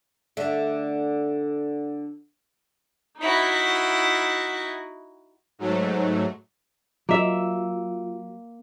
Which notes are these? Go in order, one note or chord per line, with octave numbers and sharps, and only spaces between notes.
D3 A3
D#4 E4 F#4
G#2 F#3 A3
F#3 A#3 F4 E5